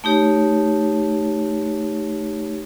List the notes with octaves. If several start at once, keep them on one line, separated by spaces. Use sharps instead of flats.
A3 D#4 G4 C#5